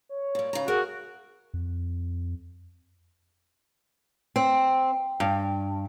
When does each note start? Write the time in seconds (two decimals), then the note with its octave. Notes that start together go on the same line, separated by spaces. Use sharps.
0.09 C#5
0.35 A#2 G3
0.53 C#3 A#5
0.68 F#4 G#4 A#4
1.54 F2
4.36 C4
5.20 G2